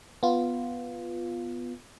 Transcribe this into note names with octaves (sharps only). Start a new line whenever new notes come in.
B3 F4